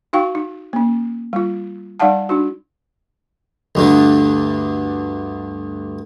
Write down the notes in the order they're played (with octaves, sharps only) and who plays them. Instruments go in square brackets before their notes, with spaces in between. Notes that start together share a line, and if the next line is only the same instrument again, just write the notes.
[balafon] D#4 F#4 F5 G5 C#6
D#4
A#3 C#4
G3 F4
G3 D#4 D5 F5 F#5 A5
D4 D#4 F#4
[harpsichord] D2 G2 D3